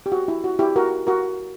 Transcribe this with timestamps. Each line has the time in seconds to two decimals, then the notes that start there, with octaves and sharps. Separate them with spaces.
0.06 G4
0.12 F#4
0.28 E4
0.44 F#4
0.59 E4 G4
0.76 F#4 A#4
1.07 F#4 A#4